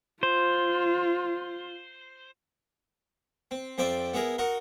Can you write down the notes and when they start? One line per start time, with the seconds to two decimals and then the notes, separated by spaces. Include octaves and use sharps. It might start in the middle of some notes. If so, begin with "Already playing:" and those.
0.23 F4 C5
3.51 C4
3.78 F2 C4 C5 D5 E5 D6
4.14 B3 E4 G#4 A#4
4.38 D#4 F#4 A#4